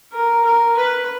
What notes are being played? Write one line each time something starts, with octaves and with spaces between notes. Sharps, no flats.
A#4
A#4
B4